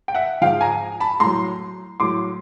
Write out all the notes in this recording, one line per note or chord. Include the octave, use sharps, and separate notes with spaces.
G5
E5 F#5
G#2 F3 F5 G5
G#5 A#5
A5 B5
A2 A#5 C6
F#3
A2 F#3 C6 D6